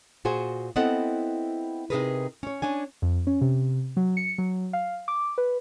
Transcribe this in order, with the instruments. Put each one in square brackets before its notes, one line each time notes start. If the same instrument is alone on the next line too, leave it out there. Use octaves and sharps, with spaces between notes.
[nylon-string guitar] A#2 F#4 G#4 C5 G#5
B3 C4 E4 A4 D#5 F#5
C3 G3 D#4 G#4 A#4 B4
C#4 C#5
C#4 D4 G#5
[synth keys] F2
C#4
C3
F#3
C#7
F#3
F5
D6
B4